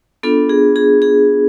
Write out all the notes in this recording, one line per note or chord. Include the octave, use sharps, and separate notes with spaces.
B3 D4 F4 A4
G#4
G#4
G#4